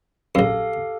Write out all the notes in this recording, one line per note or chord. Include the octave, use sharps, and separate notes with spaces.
A#1 F#2 G4 A4 F5